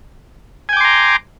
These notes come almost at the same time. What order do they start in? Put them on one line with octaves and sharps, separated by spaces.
G#5 G5 D6 C6 A#5